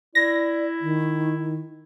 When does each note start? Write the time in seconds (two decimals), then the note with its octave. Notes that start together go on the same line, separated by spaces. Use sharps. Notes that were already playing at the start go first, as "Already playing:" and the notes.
0.15 E4 D5 A#6
0.81 D#3